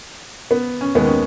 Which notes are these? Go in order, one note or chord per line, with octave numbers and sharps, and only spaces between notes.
B3
C#4
D#2 D#3 G#3 B3
C#4